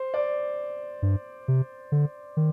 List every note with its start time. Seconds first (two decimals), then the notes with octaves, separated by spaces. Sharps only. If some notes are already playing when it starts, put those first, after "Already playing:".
Already playing: C5
0.14 D5
1.02 G2
1.48 C3
1.92 D3
2.37 D#3